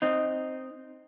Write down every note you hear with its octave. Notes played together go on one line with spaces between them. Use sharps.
C4 D#4